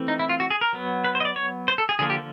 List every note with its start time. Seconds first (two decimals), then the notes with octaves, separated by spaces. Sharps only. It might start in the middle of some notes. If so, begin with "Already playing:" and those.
Already playing: E3 A3 C4
0.08 D#4
0.19 E4
0.29 F4
0.40 F#4
0.50 G#4
0.61 A#4
0.73 F#3 B3
1.04 B4
1.15 C5
1.20 D#5
1.25 D5
1.36 C#5
1.68 C5
1.78 A4
1.89 G#4
1.99 D3 F3 A#3 G#4
2.10 G4